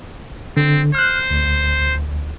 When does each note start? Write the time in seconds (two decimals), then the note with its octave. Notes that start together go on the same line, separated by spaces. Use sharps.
0.57 D3 C4
0.95 C5 F6 F#6
1.31 D2